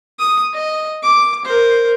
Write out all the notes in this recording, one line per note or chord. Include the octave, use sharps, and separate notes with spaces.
D#6
D#5
D6
A#4 C5